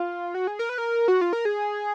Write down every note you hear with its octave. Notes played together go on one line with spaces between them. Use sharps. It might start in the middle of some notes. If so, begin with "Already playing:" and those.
Already playing: F4
F#4
G#4
A#4
B4
A#4
F#4
F4
A#4
G#4